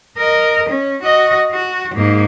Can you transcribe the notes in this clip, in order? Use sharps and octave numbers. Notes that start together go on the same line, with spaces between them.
A#4 D#5
C#4
F#4 D#5
F#4
G#2 A#3